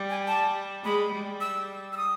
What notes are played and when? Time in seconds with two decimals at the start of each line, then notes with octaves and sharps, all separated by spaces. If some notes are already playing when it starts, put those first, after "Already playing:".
Already playing: G3
0.10 G#5
0.27 A5
0.84 G#3 B5
1.12 G3
1.41 E6
1.93 E6
1.97 D#6